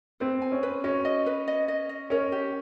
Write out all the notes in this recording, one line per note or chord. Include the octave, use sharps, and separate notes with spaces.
C4 B4
G#5
C#4
B4
C#4 F#4
D#5
B4
D#5
D#5
D#5
C#4 A#4
G4